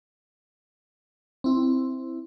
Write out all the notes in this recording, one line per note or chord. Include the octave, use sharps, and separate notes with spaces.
C4 E4